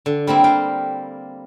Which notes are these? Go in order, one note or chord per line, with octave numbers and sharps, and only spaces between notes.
D3
G3 A#3 C4 E4
G3 F5 G5